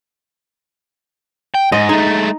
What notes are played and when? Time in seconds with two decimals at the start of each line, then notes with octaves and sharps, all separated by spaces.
1.55 G5
1.72 G#2 D#5
1.89 G#3 A3 D#4